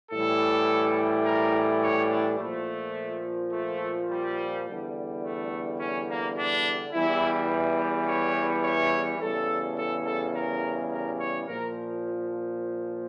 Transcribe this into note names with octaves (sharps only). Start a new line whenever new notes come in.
A2 E3 G3 A4
A#4
C#5
D4
A#2 F3 A3
A3
G3
E2 D3 G3
A3
C#4
A#3
D4
E2 E3 G3 E4
C#5
C#5
E2 C#3 G3 A4
A4
A4
A#4
A#4
C#5
A#2 F3 A#4